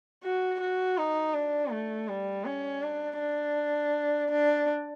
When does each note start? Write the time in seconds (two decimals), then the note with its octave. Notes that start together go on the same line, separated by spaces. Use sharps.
0.23 F#4
0.60 F#4
0.97 D#4
1.34 D4
1.71 A3
2.08 G3
2.45 C#4
2.82 D4
3.19 D4
4.31 D4